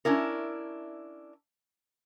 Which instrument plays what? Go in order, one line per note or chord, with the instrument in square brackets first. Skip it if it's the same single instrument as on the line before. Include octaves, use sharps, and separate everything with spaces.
[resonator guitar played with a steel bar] C#4 D4 E4 A#4